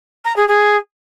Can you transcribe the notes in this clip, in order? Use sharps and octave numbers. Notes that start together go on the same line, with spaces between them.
A#5
G#4
G#4